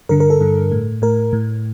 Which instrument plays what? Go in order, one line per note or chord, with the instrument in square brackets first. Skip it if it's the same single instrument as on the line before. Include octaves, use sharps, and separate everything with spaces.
[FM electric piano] G2 D3 A#4
A#4
A4
G2 D3
A2
A2 A#4
A2